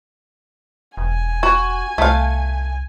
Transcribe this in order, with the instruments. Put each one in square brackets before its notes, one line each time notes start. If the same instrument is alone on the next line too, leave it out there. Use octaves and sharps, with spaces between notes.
[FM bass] E1 [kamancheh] G#5
[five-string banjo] F#4
[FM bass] C2 [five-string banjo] A3 F5